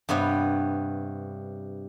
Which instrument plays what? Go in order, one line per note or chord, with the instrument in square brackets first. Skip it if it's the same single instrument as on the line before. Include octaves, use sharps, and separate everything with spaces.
[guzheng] G2 C3 B3 C#5